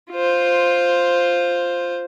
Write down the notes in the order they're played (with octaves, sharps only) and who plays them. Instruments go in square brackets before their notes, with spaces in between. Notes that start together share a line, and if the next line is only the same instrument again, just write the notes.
[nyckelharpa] F4 C5